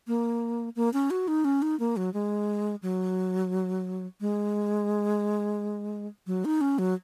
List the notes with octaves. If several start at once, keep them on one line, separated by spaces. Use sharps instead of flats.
A#3
A#3
C#4
F#4
D#4
C#4
D#4
A#3
F#3
G#3
F#3
G#3
F#3
D#4
C#4
F#3